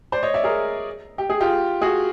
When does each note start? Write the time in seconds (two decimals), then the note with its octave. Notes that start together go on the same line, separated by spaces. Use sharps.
0.12 C5 D5
0.23 C#5 D#5
0.34 D5 E5
0.44 G#4 A#4
1.18 G4
1.30 G#4
1.41 F4 G4
1.81 F#4 G#4